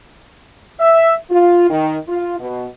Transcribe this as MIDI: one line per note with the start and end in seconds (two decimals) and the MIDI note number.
0.80 1.15 76
1.31 1.68 65
1.70 1.96 51
2.08 2.38 65
2.39 2.66 47